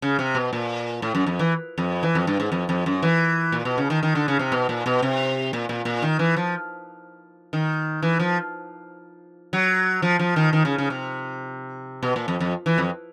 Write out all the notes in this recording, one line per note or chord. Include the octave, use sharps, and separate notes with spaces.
C#3
C3
B2
A#2
A2
F#2
F2
E3
F2
E3
F2
G2
G#2
F2
F2
F#2
E3
A#2
B2
C#3
D#3
D#3
D3
C#3
C3
B2
A#2
B2
C3
A#2
A#2
A#2
D#3
E3
F3
D#3
E3
F3
F#3
F3
F3
D#3
D#3
C#3
C#3
C3
B2
A#2
F2
F2
E3
F2